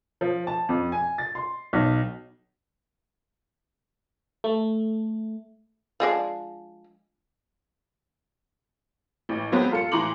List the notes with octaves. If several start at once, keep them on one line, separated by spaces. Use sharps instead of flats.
F3
A5
F2
G#5
A6
C6
B1
A3
F3 G#3 D4
A1
F#3 G#3 B3 C4 F#4
F4 A4 C#7
A2 E3 A#5 C6 D6 F#7